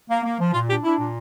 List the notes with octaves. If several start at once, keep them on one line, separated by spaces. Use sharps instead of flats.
A#3
A#3
F3
A#2 F4
D4 G4
D4 E4
A#2